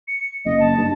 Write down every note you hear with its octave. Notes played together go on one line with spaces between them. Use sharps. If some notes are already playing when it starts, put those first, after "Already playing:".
C#7
F#1 D#5
A5
G2